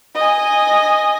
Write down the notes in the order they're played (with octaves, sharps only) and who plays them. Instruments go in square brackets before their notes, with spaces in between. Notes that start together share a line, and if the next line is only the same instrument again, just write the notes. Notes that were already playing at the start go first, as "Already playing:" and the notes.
[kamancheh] D#5 G#5